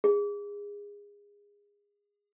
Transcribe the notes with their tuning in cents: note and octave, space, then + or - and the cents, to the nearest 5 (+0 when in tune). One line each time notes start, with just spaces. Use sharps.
G#4 -25